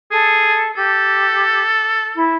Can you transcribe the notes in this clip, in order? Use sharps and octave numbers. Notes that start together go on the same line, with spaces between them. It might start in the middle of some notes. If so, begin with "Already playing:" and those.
G#4 A4
G4 A4
E4